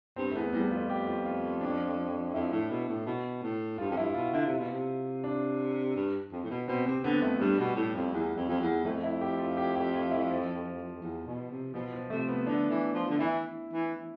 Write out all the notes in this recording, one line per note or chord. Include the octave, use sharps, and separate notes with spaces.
G2 C4
A3
E2 B3
E2 G3
F2 F4
G4
F4
F4
D4
F2 E4
A2
B2
A2
B2
A2
G2 F4
F2
G2 E4
B2 F4
D3 E4
C3 F4
B2
C3
D4
G2
F2
A2
B2
B2 C4
C3 C4
D3 B3
F2 A3
G2 G3
B2
A2
F2
E2
F2
F2
E2
F2 A3
E4
G4
F4
G4
G4
F4
E4
F3
E2
B2
C3
B2 F3
F3
C3 A3
B3
D3 D4
E3
F3
D3
E3 E4
E3